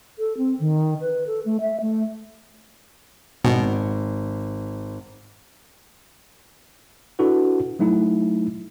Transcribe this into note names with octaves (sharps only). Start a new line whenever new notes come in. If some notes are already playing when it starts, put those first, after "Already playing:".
A4
C4
D#3
B4
A4
A3
E5
A3
G#1 B2
D4 E4 F#4 A4 B4
F#3 A3 D#4 E4